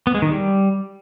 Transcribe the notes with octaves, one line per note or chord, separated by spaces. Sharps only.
B3
G#3
D#3
G3